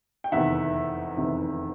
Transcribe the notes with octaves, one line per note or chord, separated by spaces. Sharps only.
G5
F1 E2 C3 D#3 E5 F#5
F1 E2 C3 D#3